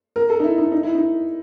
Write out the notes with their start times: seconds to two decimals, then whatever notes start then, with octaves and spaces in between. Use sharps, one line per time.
0.16 A#4
0.30 A4
0.40 D#4
0.44 E4
0.58 D#4
0.72 D#4
0.83 E4
0.95 D#4